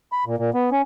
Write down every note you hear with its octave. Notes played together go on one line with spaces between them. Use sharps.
B5
A#2
A#2
B3
C#4